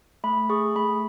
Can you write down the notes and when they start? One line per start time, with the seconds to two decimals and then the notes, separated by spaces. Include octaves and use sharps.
0.24 A3 B5
0.50 G#4 C#6
0.76 A3 B5